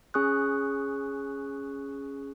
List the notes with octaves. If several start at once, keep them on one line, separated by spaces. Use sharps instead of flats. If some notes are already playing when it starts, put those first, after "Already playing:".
C#4 G#4 C#6 D#6 F#6